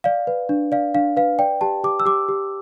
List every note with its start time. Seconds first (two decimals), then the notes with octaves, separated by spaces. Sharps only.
0.04 D5 F5
0.27 B4
0.49 D4
0.72 D5 F5
0.95 D4 F5
1.17 B4 F5
1.39 D5 G5
1.61 G4 A5
1.84 G4 D6
2.00 E6
2.05 G4 D6
2.29 G4